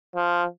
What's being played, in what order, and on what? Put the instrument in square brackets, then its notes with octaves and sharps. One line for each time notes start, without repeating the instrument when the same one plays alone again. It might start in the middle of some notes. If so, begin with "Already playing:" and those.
[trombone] F3